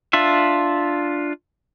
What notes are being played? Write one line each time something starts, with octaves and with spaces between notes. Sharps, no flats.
D4 F4 E5